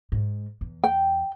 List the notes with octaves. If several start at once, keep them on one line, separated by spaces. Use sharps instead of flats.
G#2
E2
G5